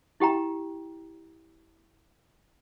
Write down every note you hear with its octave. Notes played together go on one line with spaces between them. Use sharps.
E4 G4 G5 A#5